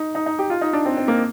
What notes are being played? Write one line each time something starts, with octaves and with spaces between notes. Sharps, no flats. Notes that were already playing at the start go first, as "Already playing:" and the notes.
Already playing: D#4
D#4
D#4
G4
F4
D#4
D4
C4
C4
A#3